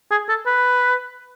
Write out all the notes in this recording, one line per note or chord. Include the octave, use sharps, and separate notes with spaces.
G#4
A4
B4